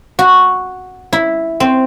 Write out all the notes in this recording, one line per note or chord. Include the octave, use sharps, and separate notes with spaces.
F#4
E4
C4